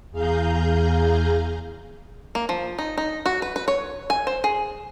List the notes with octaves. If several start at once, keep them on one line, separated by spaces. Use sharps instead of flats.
E2 G#4 F5 A#5 G6
A#3
F3
D#4
D#4
F#4
B4
B4
C#5
G#5
C5
G#4